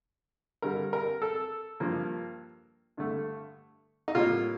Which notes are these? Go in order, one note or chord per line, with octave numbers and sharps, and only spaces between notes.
G2 D3 G3 A#4
A#4
A4
G2 F3 A#3
G2 D3 A3
D#4
A2 G3 A#3 F4